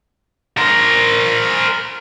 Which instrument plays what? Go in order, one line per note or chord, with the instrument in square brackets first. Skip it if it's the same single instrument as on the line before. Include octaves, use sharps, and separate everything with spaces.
[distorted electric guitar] A#4 C5